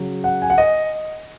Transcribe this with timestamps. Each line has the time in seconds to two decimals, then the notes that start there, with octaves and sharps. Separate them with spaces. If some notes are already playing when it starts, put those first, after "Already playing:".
Already playing: C#3 F#3
0.24 F#5
0.42 G#5
0.50 F#5
0.58 D#5